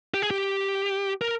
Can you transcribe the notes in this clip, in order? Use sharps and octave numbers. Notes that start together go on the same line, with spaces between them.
G4
G#4
G4
A#4